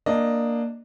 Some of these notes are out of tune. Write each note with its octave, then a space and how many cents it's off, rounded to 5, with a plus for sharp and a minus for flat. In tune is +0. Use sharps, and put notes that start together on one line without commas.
A#3 +0 D4 +10 D#5 +0